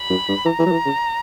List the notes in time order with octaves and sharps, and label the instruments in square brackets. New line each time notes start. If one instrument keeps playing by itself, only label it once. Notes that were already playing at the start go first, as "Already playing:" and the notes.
Already playing: [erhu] B5
[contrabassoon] F#2
G2
[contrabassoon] E3 [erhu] A#5
[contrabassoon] E3
F#3
E3
C#3